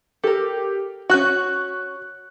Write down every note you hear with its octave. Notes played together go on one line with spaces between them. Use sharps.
G4 A4 A#4
C#4 F#4 C#6 F#6